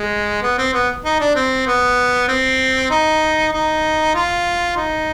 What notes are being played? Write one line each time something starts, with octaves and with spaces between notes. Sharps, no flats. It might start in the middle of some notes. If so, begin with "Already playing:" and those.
Already playing: G#3
B3
C4
B3
D#4
D4
C4
B3
C4
D#4
D#4
F4
D#4